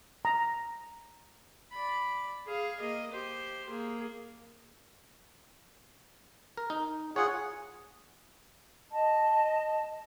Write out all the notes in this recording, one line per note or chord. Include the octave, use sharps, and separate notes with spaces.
A#5
D5 B5
G#4 F5
A#3 D#5
G4 C5
A#3 G#4
A#4
D#4
F4 G#4 C#5 F#5
D#5 A5